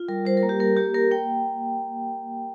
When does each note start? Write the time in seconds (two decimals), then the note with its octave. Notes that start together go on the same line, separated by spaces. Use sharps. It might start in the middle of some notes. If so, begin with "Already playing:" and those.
Already playing: F4
0.08 G3 A#4
0.26 G3 C5
0.37 A#4
0.43 A#3
0.49 G4
0.60 A#3 A#4
0.77 A#3 G4
0.94 A#3 A#4
1.11 A#3 G5